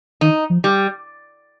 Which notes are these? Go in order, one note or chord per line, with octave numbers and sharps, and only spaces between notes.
D#3 D#4
F3
G3